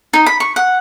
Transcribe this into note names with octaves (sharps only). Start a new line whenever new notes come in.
D#4
B5
C#6
F#5